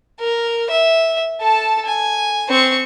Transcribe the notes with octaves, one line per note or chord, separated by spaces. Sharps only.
A#4
E5
A4 A5
G#5
C4 C#6